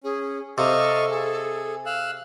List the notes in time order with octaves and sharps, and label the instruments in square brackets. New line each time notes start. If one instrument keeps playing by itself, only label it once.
[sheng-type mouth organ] C#4 [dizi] G#4
[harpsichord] C3 [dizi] A4 [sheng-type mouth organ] D#5 F5 C#6
[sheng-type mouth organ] G#4
F5 E6 F#6